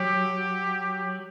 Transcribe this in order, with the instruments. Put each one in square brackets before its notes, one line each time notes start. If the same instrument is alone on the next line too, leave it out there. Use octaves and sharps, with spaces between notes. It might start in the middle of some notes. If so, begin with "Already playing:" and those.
Already playing: [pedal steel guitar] F#3 [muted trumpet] G4